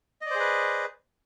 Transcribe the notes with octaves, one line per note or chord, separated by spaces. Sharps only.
G#4 B4 C5 D5 D#5